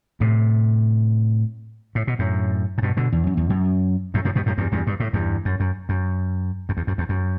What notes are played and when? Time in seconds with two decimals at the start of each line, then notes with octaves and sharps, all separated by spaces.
0.20 A2 C3
1.95 A2
2.07 B2
2.19 F#2 A2
2.78 A2
2.82 G2 B2
2.97 B2 D3
3.12 E2
3.27 F#2
3.37 E2
3.50 F#2
4.14 F#2 A2
4.25 F#2 A2
4.35 G2 B2
4.46 F#2 A2
4.58 E2 G2
4.72 E2 G2
4.87 G2
5.00 A2
5.13 E2 G2
5.45 F#2
5.60 F#2
5.89 F#2
6.69 F#2
6.77 E2
6.87 F#2
6.98 E2
7.09 F#2